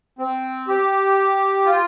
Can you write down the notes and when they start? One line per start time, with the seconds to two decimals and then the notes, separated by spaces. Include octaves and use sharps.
0.19 C4
0.68 G4
1.66 F4